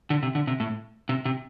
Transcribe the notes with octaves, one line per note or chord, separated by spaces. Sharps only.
D3
C3
D3
C3
A2
C3
C3